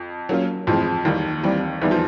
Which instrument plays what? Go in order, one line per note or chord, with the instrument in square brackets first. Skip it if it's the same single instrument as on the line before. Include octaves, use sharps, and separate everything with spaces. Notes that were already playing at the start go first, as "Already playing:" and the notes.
Already playing: [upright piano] F2
[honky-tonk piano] F#3 A#3 C#4 F4
[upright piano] F2 F3 [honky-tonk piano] A2 E3 G#3 C4
[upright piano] D#2 D#3 [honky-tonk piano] E3 G3 A#3 D#4
[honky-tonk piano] E3 G3 C4
[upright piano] E2 E3 [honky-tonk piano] D#3 G3 B3 D#4
[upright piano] F3